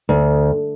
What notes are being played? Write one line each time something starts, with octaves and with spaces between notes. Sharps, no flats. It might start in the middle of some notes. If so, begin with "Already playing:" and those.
D2